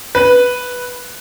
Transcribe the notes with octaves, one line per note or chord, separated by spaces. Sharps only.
B4